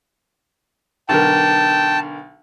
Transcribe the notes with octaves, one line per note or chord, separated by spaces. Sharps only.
B1 D3 A#4 G5 A5